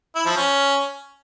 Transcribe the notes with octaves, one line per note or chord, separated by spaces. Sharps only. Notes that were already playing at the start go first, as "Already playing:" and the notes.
E4
F3
C#4